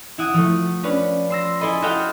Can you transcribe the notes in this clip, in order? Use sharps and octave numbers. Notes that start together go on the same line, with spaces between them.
E4 F#5 D#6
F3 A3
C#4 D4 B4
C6 E6 A#6
E4 G#4 A4 D#5 B5 C6
F#4 G4 A4 D#5 F5 G5